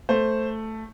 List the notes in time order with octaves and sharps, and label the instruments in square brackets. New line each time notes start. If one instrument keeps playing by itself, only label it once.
[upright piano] A3 C5